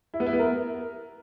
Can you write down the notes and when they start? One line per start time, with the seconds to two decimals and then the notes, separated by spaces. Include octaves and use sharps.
0.14 E4
0.20 B3
0.26 E4
0.33 B3
0.39 A#4